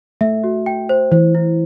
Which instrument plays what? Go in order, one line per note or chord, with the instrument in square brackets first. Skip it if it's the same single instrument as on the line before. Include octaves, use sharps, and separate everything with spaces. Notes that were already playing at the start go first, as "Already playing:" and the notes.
[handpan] A3 [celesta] E5
[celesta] F#4
G5
C5
[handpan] E3 [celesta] C5
[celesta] E4